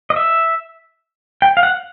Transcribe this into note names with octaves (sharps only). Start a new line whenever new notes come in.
D#5
E5
G5
F5
F#5